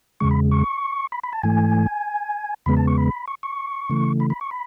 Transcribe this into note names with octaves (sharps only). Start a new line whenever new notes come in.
E2 C#3 G#3 C#6
B5
C#6
B5
B5
A5
G#2 E3 A3 G#5
E2 C#3 G#3 B3 B5
A5
C#6
B5
C#6
C#6
C#3 E3 A3
B5
B5
C#6
B5